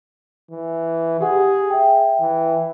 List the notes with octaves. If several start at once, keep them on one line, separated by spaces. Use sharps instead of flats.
E3
G4 G#4 F#5
E5 G5
E3